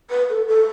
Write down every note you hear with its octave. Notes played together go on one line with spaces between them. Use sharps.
B4
A4
A4